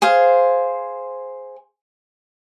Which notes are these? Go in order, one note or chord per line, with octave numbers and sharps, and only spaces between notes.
G#4 C5 F5